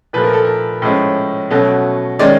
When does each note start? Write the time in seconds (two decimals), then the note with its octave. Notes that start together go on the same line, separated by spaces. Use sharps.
0.13 A#2 F3 A3 B4
0.24 A#4
0.33 A4
0.44 A#4
0.82 A2 F3 G#3 C#4
1.50 B2 F#3 A3 C#4
2.19 D#3 G#3 C#4 D5